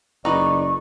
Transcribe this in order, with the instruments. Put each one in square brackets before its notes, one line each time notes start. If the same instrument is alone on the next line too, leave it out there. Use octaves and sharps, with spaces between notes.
[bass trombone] F#1 [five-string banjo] D#4 B4 D#5 [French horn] D5 [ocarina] C#6